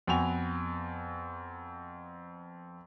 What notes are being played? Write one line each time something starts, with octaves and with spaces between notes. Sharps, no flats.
F2 B3 F#4 G5 G#5 F7